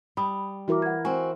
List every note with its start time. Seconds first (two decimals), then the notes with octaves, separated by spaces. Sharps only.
0.17 G3 B5 D#6
0.68 E3 E4 F#4 A#4 D6
0.82 F#5 G#6
1.05 C4 F#4 G#5